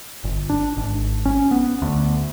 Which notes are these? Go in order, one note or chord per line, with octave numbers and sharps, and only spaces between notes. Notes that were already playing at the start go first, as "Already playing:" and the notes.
G1
D4
G#1
C#4
B3
D2